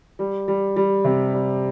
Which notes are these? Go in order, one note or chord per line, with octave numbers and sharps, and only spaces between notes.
G3
G3
G3
C3
G3